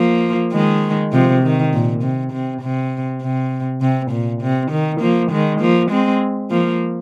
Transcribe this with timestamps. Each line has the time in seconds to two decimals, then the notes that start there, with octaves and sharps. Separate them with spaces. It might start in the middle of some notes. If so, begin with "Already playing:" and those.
Already playing: F3 A#3
0.52 D#3 G#3
1.12 C3 F3
1.43 D#3
1.73 A#2
2.03 C3
2.33 C3
2.62 C3
3.22 C3
3.81 C3
4.11 A#2
4.42 C3
4.71 D#3
5.01 F3 A#3
5.31 D#3 G#3
5.60 F3 A#3
5.91 G#3 C4
6.50 F3 A#3